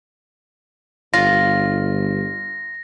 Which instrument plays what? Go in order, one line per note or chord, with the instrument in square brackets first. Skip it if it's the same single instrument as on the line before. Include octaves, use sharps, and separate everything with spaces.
[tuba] G1 [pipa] F4 [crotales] A#6